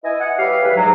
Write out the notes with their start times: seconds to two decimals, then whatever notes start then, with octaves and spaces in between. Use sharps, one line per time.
0.04 E4 B4 D#5 G#5
0.20 F#5
0.39 G3 G4 B4 C#5 E5 F5
0.63 E3 G3 E4 G#4 B4
0.76 G#2 F#3